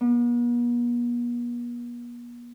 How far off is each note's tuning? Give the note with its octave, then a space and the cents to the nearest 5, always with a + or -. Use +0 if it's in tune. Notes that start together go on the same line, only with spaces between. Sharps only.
B3 -45